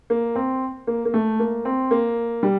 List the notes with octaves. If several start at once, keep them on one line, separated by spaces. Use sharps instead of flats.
A#3
C4
A#3
A#3
A3
A#3
C4
A#3
G3